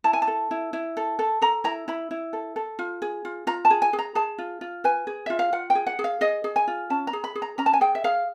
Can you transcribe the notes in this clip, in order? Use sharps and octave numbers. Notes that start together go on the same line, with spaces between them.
E4 A5
G#5
A5
A4
E4
E4
A4
A4
A4 A#5
E4 A#5
E4 B5
E4
A4
A4
F4
G#4
F4
F4 A#5
A5
G#4
G#5
G#4
A#5
G#4 A5
F4
F4
B4 G#5
G#4
F4 E5
F5
F4 F#5
G5
G#4
F#5
G#4
F5
G#4 D#5
G#4
G#5
F4
C#4 A5
A#5
G#4
B5
G#4
A#5
C#4 A#5
A5
G#5
G#4 G5
E5
G#4 F5